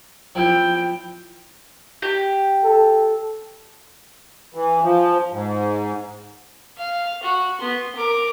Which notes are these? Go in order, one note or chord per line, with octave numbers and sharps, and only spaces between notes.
F3 E4 G5
G4
A4
E3
F3
G#2
F5
F#4
B3 C6
A#4 D6